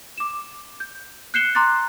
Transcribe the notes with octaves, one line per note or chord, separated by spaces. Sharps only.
D6 E7
G6
F#6 G6 C7 C#7 E7 G7
A#5 C6 D6 F#6 A6